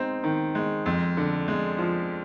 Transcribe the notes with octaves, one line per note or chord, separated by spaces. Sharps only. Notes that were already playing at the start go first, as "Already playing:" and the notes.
Already playing: G#3 C4 D#4
D#3
G#3
F2
D3
G#3
F3